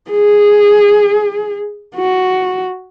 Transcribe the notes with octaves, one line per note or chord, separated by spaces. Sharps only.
G#4
F#4